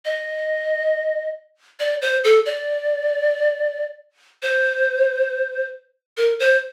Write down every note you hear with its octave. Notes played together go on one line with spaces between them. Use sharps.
D#5
D5
C5
A4
D5
C5
A#4
C5